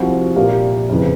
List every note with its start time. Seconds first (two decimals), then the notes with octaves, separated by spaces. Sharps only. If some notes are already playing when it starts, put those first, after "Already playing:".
Already playing: C2 C3 F3 F#4
0.36 A#2 G3 A#3
0.90 F2 C#3 E3